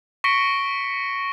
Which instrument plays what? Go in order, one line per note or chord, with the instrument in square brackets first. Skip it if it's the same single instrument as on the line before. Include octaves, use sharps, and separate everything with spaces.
[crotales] C#6 A#6 B6 C#7 D7 G7